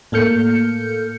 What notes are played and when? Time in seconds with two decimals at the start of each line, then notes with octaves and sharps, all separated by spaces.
0.12 A2 A#3 A4 F6 G6 C#7